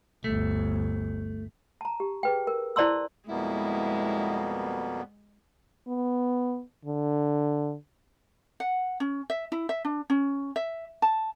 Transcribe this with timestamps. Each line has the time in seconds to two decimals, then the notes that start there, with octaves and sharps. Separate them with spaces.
0.24 G1 D2 A3
1.81 A5 A#5
2.00 G4
2.23 G#4 B4 G5
2.47 A#4
2.76 E4 C5 D5 A5 C6 E6
3.29 F2 B2 G3 G#3 A#3 B3 E4
5.88 B3
6.85 D3
8.60 F#5
9.00 C#4
9.30 E5
9.52 E4
9.69 E5
9.85 D4
10.10 C#4
10.56 E5
11.02 A5